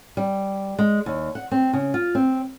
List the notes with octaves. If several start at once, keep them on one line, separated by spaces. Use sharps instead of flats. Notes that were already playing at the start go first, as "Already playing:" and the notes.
G3
G#3
D#2
F#5
C4
C#3
F4
C4